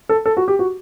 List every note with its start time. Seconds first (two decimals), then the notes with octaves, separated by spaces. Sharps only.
0.09 A4
0.26 A4
0.37 F#4
0.48 G4
0.59 F#4